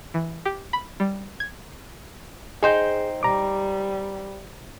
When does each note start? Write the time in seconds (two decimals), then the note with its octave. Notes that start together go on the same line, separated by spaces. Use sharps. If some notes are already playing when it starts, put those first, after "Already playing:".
0.14 E3
0.45 G4
0.73 B5
1.00 G3
1.40 G#6
2.63 D#4 G#4 C5 G5
3.23 G3 A#5 D6